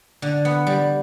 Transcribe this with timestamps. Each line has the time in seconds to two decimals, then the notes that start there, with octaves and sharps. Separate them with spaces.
0.22 D3
0.45 B3
0.67 G3